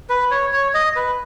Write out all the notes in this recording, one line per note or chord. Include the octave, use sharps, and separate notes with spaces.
B4
C#5
C#5
D#5
B4